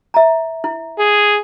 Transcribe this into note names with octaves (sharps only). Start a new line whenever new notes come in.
E5 A#5
E4
G#4